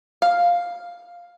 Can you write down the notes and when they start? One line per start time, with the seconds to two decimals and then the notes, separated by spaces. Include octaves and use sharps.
0.22 F5